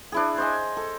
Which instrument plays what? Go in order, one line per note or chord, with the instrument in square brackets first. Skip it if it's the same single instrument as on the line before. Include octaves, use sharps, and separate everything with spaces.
[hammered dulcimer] D4 E4 G#4
C5 D#5 G#5
A4